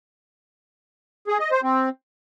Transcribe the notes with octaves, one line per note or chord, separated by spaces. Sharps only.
G#4
D#5
C5
C4